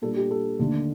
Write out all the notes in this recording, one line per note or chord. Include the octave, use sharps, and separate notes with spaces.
A#2 G3 D4 A4
G4
A4
D#2 D3 A3 D4